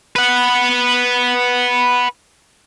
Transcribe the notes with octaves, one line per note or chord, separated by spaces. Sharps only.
B4 F#5